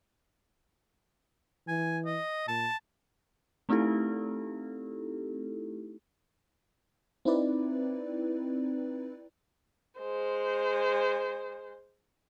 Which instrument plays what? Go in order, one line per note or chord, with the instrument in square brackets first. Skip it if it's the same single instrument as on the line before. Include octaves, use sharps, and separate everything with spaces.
[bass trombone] E3 [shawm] G#5
[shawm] D#5
[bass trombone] A#2 [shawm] A5
[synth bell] A3 C4 D#4 E4 G4 A4
[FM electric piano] C4 D#4 E4 B4 D5
[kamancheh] G#3 C5